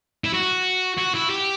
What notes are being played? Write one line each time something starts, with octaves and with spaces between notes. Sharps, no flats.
E4
F#4
F#4
E4
G4